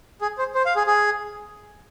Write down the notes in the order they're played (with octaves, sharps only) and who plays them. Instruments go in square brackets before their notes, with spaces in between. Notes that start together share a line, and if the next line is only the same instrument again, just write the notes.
[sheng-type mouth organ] G#4
C5
C5
F5
G#4
G#4